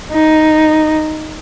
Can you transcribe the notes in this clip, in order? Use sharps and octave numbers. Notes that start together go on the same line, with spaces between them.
D#4